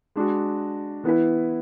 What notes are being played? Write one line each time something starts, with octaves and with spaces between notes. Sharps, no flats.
G#3 D4 F#4
E3 B3 E4 B4